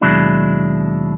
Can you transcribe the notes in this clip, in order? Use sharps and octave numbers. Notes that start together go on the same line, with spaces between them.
D#2 B2 F#3 G#3 D4 E4